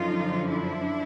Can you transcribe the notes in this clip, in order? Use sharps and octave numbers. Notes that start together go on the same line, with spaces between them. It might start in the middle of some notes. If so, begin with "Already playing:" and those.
Already playing: F#2 D3 F3 D#4 F4
D4 E4